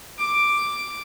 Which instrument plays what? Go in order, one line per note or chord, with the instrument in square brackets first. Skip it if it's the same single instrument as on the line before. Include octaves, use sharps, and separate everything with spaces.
[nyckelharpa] D6